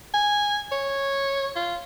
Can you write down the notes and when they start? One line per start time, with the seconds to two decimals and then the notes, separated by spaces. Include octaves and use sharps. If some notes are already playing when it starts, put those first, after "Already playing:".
0.14 G#5
0.72 C#5
1.56 F4